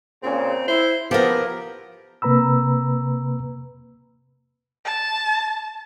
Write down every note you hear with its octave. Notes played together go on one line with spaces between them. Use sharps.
A#2 C#3 C4
E4 C5
F3 B3 E4 G4 A#4
C3 A#3 B4 A#5 B5 E6
A5